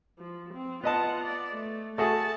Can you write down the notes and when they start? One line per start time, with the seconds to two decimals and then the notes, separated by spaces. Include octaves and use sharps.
0.19 F3
0.53 C4
0.84 B3 F4 D#5 F#5 A5
1.24 D5
1.53 A3
1.98 A3 F#4 G#4 A5